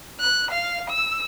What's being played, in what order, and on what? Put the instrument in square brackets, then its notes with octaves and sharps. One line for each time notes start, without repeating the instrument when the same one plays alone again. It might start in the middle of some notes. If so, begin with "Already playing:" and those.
[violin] F#6
F5
E6